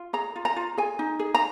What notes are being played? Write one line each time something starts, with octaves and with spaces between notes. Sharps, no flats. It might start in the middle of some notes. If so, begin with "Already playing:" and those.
Already playing: F4
G#4 A#5
F4
A#5
F4
G#4 G#5
D#4
G#4
A#5